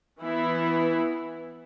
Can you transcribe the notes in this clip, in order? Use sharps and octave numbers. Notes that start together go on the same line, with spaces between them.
E3 B3 E4